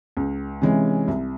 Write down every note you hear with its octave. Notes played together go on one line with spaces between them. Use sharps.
C#2
C3 E3 G#3 C#4
C2